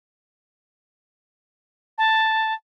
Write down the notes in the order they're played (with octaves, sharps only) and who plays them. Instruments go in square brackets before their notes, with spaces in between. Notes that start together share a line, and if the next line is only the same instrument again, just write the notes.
[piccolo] A5